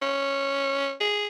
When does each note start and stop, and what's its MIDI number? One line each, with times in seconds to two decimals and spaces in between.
0.02 0.93 61
1.00 1.27 68